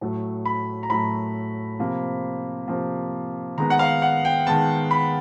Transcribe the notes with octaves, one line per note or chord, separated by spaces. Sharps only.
A2 F#3 A3
B5
A#5
A2 F#3 A3 B5
C3 F3 A#3
C3 F3 A#3
D#3 G#3 B3 A#5
F#5
F5
F#5
G5
D#3 G#3 B3 A5
B5